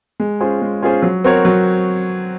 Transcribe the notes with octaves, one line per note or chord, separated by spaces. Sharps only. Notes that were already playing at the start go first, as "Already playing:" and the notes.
G#3
C#4 F4 G#4 C5
G#3
C#4 F4 G#4 C5
F#3
C4 F#4 A#4 C#5
F#3